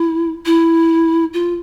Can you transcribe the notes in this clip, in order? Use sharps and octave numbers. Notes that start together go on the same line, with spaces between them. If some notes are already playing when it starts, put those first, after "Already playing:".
Already playing: E4
E4
F4